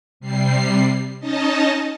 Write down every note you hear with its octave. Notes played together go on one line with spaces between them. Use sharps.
C3 G3 C7
C#4 D#4 D#5 A5